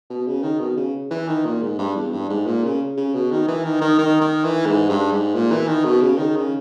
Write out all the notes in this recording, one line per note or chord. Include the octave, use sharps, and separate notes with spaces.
B2
C#3
D#3
B2
C#3
E3
D#3
A#2
G#2
G2
E2
G2
G#2
A#2
C#3
C#3
B2
D#3
E3
D#3
D#3
D#3
D#3
E3
G#2
G2
G#2
A#2
E3
D#3
B2
C#3
D#3
C#3